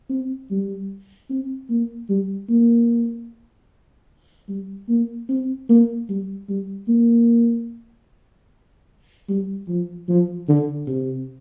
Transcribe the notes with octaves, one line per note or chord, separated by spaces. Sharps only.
C4
G3
C4
A#3
G3
A#3
G3
A#3
C4
A#3
G3
G3
A#3
G3
F3
F3
D3
C3